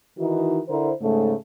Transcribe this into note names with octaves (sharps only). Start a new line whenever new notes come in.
D#3 E3 D#4 E4 F#4
D3 E4 A#4 C5
G#2 C#3 A3